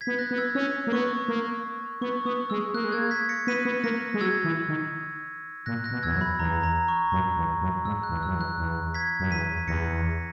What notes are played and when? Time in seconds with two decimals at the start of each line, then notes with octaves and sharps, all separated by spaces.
0.01 G#6 B6
0.07 B3
0.19 F#6 A#6
0.31 B3
0.37 E6 G#6
0.55 C#4 E6
0.87 A#3
0.92 B3 C#6
1.28 A#3
2.01 B3 C#6
2.25 B3 D#6
2.50 G#3 E6
2.74 A#3 F#6
2.84 G#3
2.92 A#3 E6 G#6
3.11 G#6 B6
3.29 A#6 C#7
3.47 B3 B6 D#7
3.65 B3
3.84 A#3 A#6 C#7
4.14 G#3
4.21 F#3 E6 G#6
4.44 E3
4.69 D#3
5.66 A#2 F#6 A#6
5.84 F#6 A#6
5.91 B2
6.03 E2 E6 G#6
6.15 F#2
6.21 B5
6.39 E2 A#5
6.63 A#5
6.88 C#6
7.12 F#2
7.37 E2
7.61 F#2
7.85 G#2 E6
8.03 F#6
8.10 E2
8.23 F#2 E6
8.35 E2
8.41 F#6
8.58 E2
8.94 G#6 B6
9.20 F#2
9.31 E2 B6 D#7
9.68 E2 A#6 C#7